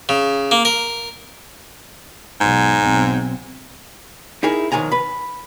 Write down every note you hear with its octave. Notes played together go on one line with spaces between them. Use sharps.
C#3
A#3
A#4
B1 G#2
B1 C4
D#4 E4 G#4 A#4
B1 D#3 F3 G#5 A#5
B4 B5